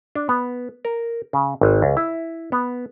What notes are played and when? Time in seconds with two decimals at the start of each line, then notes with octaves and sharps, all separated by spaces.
0.15 D4
0.29 B3
0.85 A#4
1.33 C#3
1.61 G#1
1.82 C#2
1.97 E4
2.52 B3